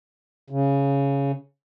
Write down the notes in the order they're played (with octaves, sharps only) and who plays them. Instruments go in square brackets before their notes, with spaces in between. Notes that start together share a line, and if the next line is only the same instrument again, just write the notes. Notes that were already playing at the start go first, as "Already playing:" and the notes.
[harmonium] C#3